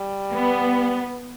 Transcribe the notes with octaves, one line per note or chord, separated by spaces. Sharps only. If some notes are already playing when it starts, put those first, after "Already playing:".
Already playing: G3
B3